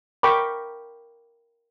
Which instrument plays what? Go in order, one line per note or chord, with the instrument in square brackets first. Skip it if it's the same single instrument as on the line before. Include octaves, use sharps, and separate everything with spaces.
[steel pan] A#4 G5 A#5 B5 C#6 D6